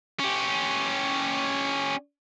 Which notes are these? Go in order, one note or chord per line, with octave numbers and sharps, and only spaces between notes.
C#4 G4